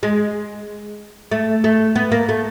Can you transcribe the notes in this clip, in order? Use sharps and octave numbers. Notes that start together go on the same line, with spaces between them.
G#3
A3
A3
B3
A#3
A3